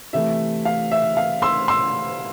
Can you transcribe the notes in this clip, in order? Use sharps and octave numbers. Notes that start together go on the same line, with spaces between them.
C3 E3 A3 E5
F5
E5
F5
C6 E6
C6 E6